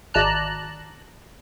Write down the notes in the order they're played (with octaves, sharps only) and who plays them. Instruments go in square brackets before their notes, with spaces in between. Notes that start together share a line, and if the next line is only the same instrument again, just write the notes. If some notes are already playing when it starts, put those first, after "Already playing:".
[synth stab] G#1 D5 A5 A#5 F#6